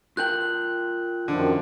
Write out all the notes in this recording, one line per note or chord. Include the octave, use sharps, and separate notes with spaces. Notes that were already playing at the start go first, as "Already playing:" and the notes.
F4 A#4 G5 F#6 G6 F#7
F#2 D3 D#3 F3